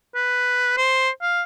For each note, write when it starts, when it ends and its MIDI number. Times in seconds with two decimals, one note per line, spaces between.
0.15 0.76 71
0.78 1.10 72
1.22 1.43 77